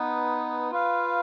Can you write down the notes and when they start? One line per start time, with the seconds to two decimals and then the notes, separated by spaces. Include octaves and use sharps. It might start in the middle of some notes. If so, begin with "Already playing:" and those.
Already playing: B3 D#4 B4
0.71 F4 B4 F5